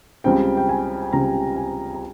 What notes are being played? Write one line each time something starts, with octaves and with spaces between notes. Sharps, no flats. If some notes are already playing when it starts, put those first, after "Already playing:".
C#2 C#3 G3 C4 G5
G5
G#5
C#2 C#3 G3 C4 A#5
G#5
A#5